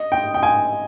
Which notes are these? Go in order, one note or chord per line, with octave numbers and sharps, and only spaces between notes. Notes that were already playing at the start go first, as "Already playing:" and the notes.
Already playing: D#5
G5
G5
G#5